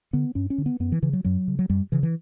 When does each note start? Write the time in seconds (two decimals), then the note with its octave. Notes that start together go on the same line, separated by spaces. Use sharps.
0.13 D3 B3
0.35 G2 C#4
0.50 C#4
0.58 D3
0.66 B3
0.80 F#2 B3
0.92 E3
1.02 C#3 E3
1.13 F#3
1.24 F#2 F#3
1.48 C#3
1.59 F#3
1.70 F#2 G3
1.92 C#3 E3
2.03 E3